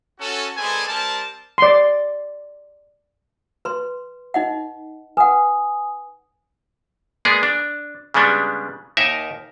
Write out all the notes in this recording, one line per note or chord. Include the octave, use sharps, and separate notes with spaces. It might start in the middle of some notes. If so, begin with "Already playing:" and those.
C#4 F#4 A4
G#3 C4 A4 B4 D5 G#5
G3 C4 A#4 A5
D5 C6
B4 C6
D#4 D#5 F#5
B4 F#5 G#5 D#6
G#3 A#3 B3 G#4 D5
D4
C#3 G3 G#3 B3 D4
D#2 D#4 A#4 E5 G#5